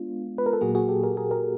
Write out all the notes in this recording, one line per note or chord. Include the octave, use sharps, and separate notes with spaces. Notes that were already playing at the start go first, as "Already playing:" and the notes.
Already playing: G#3 B3 D4 F4
B4
A#4
A4
A#2 F#3 A#3 F#4 G#4
F#4 G#4
G4 A4
G#4 A#4
G#4 A#4
G#4 A#4